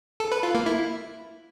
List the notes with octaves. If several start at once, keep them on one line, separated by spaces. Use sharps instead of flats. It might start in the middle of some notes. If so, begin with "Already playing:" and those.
A4
B4
F4
A#3
E4